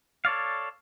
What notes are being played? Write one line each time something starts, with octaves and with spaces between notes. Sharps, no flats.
A4 C#5 D5 F5